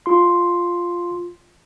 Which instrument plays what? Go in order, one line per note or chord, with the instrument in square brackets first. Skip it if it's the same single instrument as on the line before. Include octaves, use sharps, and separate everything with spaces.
[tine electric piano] F4 C6